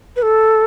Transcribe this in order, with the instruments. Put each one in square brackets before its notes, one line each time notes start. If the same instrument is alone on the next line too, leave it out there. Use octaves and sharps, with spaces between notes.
[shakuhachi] B4
A4